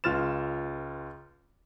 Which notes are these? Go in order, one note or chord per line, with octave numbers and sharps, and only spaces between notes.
C#2 F4 F6 A6 E7